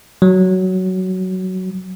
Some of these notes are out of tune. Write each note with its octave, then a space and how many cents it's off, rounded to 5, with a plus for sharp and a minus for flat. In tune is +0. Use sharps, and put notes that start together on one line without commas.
F#3 +10